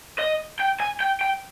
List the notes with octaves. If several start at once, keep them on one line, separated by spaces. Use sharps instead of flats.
D#5
G5
G#5
G5
G5